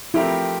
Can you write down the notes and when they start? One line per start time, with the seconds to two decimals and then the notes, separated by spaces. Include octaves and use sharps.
0.14 F3 A3 C4 E4 G4 A#4